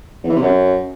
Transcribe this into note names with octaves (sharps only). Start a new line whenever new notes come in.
E2
E3
C3
F#2